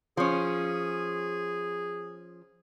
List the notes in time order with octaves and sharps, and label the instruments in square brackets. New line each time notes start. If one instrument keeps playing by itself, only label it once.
[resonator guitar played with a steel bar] F3 C#4 [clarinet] G#4